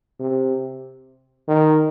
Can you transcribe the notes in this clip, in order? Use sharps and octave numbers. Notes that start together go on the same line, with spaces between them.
C3
D#3